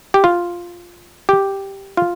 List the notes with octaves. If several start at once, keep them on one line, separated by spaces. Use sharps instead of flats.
G4
F4
G4
F4